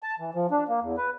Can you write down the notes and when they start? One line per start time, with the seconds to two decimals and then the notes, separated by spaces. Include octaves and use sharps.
0.03 A5
0.19 E3
0.34 F3
0.51 D4
0.69 A#3
0.81 E2
0.97 B4